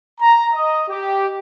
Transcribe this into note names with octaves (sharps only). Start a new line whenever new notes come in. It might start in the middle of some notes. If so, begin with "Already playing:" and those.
A#5
D#5
G4